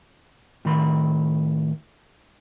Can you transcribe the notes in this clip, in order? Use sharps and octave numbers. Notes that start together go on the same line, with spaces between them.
A2 D#3 B5